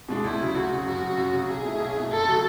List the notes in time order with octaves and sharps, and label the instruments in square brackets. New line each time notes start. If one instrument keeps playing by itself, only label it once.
[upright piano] B2 G#3 D4
[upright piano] D2 [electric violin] E4
[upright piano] C#3 F#3
[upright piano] D2 [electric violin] F#4
[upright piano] C#3 F#3
[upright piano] F#2 [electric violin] F#4
[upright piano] C#3 F#3
F#2
C#3 F#3
[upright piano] B1 [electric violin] G#4
[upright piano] B2 A3 E4
B1
B2 A3 E4
[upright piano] F#1 [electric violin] A4
[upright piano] C#3 F#3 C#4